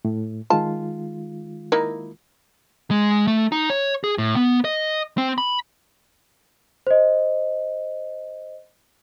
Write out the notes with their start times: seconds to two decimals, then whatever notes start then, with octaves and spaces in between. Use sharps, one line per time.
0.05 A2
0.50 D#3 G#3 F4 A5
1.72 A#3 D#4 E4
2.91 G#3
3.27 A3
3.52 D#4
3.70 C#5
4.04 G#4
4.18 A2
4.36 B3
4.64 D#5
5.18 C4
5.38 B5
6.87 C5 D#5